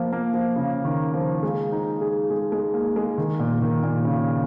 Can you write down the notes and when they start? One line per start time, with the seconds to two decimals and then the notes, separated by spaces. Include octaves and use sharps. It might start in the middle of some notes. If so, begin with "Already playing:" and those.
Already playing: F3 A#3
0.12 A#3
0.34 F3
0.56 C#3
0.85 D#3
1.14 F3
1.43 G#3
1.72 D#4
2.01 G#4
2.30 G#3
2.52 G#3
2.74 A#3
2.96 G#3
3.18 D#3
3.39 A#2
3.62 D#3
3.83 A#2
4.05 C#3